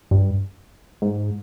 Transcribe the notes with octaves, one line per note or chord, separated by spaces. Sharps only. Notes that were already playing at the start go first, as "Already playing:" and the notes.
G2
G#2